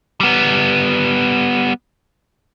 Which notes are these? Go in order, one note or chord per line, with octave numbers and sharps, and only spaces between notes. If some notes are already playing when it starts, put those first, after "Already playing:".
G3 B3